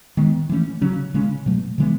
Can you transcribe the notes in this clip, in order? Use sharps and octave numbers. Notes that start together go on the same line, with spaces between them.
D#3 G#3 B3
E3 A3 C#4
C#3 F#3 C#4
C#3 G#3 C#4
B2 F#3 A3
C#3 E3 G#3 B3